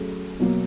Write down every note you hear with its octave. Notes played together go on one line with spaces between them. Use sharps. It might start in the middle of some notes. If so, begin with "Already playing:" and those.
Already playing: F#3 A3 C#4 G#4
B2 F#3 A#3